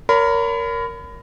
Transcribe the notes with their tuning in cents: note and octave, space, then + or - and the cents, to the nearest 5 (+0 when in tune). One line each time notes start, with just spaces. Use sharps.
A#4 +0 C#5 +30 B5 +30